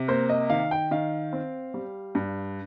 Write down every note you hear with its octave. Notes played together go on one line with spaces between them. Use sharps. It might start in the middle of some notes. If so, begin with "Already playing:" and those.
Already playing: C3
A#3 C5
D#5
D#3 F5
G5
D#3 F5
C4
G3
G2